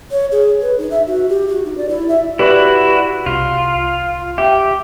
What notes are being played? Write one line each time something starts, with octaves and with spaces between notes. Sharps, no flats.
C#5
G#4
B4
D#4
E5
F#4
G4
F#4
D#4
D5
E4
E5
E4 F#4 G4 B4 D5
C2 F4
G4 E5 G5